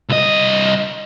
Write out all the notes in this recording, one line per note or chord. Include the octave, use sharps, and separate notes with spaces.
C2 D#5